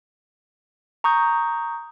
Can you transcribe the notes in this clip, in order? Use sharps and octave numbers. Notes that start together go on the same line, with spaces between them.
A#5 C#6 D#6 G6